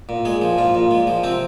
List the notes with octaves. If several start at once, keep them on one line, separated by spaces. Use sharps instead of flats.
A#2
G#3 G#4
F3
A#2 F4
A#2
G#3
F3
C3 C4